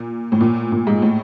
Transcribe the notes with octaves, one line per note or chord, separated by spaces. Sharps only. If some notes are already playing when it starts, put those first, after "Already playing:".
Already playing: A#2
A2
A#2
A#2
G#2
A2